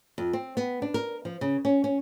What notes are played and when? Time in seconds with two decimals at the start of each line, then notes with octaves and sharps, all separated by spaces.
0.18 F2
0.33 C4
0.57 B3
0.82 D4
0.94 A#4
1.25 F3
1.41 C#3
1.65 C#4
1.84 C#4